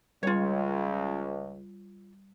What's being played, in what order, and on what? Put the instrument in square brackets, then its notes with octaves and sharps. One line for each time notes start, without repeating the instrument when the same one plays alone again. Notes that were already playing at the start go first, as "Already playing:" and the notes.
[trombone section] C#2 [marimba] G3 [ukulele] F4 C#5